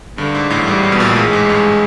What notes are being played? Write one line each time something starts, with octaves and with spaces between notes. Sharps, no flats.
G2 D3
G#2
A1 A2
G#2 G3
A1 A2
B2
A#1 A#2
A1 A2 G#3
G#2
G2